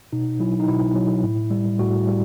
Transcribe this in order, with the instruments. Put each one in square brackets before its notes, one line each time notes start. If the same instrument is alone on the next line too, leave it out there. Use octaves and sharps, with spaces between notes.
[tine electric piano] B2 D#4
F#3 E4
D#4
B2 E4
F#3
A2
G3
A2 F#4
G3